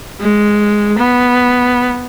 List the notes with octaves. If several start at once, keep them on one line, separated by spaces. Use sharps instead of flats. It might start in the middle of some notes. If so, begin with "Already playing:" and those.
G#3
B3